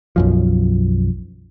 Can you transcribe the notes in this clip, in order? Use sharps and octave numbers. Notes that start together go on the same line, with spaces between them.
B1 F#2 F3